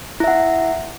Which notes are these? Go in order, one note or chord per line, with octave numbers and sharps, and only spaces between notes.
E4 E5 F#5